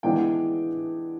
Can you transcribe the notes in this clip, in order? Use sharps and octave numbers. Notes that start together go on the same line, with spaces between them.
E3 G#3 B3 D4 G5